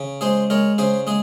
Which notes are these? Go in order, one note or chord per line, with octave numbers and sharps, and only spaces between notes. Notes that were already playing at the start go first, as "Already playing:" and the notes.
Already playing: C#3
G#3 G#4 C5
G#3 A#4 C#5
C#3 G#4 C5
G#3 G#4